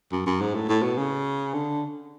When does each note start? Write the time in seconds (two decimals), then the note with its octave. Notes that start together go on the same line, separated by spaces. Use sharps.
0.12 F#2
0.26 F#2
0.41 G#2
0.54 A2
0.68 A2
0.82 B2
0.97 C#3
1.54 D3